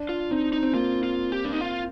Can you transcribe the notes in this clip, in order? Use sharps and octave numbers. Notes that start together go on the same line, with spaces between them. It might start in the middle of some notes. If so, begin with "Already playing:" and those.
Already playing: D4
F4
C4 D#4
D#4
C4
A#3 F4
F4
G4
D4
D#4
F4